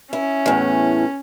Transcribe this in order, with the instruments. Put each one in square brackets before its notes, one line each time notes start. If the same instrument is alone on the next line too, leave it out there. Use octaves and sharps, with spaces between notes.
[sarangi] C#4 [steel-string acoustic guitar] E4
[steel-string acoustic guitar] E2 A2